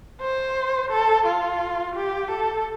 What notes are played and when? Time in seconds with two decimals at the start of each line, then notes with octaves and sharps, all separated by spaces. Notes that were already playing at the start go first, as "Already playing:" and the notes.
0.21 C5
0.91 A4
1.26 F4
1.96 G4
2.31 A4